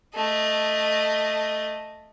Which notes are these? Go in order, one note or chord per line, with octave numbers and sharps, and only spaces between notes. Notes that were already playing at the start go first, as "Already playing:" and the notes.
A3 D#5